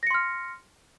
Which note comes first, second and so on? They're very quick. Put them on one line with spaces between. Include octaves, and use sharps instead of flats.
A#6 C#7 C6 F6